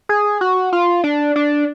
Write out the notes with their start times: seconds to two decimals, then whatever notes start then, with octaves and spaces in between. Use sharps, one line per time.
0.09 G#4
0.41 F#4
0.73 F4
1.04 D4
1.36 D4